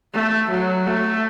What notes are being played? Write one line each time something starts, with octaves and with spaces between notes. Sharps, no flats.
A3
F#3
A3